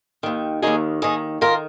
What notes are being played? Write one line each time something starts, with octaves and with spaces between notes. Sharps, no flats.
D#2 D#3
D#2 D#3 D#4 G#4
D#2 D#3 D#4 G#4
D#3 F4 A#4